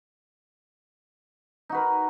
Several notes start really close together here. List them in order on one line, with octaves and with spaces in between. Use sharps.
D#4 F#4 B4 A#4